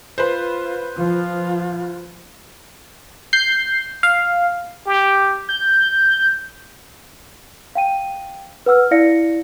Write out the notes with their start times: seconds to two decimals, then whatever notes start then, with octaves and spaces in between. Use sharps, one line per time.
0.18 F4 B4 C5
0.96 F3 F4
3.33 G6 C7
4.03 F5
4.87 G4
5.49 G6
7.75 F5 G5 D#7
8.66 B4 F#5 E6 F6
8.91 E4 D5 F5 A#6 C#7